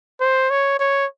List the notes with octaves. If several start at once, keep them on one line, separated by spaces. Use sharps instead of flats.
C5
C#5
C#5